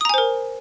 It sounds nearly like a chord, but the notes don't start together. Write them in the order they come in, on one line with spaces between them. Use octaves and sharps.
D#6 A#5 G#5 C5 A#4